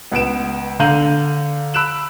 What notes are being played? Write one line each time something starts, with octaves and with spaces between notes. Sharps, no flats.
C#2 B3 B4 D7 E7
D3 F5 A#5 G6 D#7 F#7
B5 E6 F#6 D7 E7 F#7